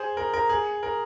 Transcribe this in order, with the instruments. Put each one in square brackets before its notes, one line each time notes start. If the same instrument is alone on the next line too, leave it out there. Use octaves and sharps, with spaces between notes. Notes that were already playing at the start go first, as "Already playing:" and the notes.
Already playing: [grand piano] G#4 C5
A#4
A#4
G#4
A#4